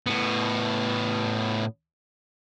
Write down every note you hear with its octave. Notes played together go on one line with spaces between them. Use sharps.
A2 B3